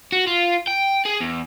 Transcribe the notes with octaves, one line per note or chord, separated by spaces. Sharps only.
F#4
F4
G5
G#4
E2